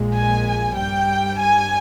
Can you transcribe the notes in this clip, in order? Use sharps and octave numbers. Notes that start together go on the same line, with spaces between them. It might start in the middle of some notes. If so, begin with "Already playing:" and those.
Already playing: A#1 A#2 G#3
G#5
G2 G3 G5
G#5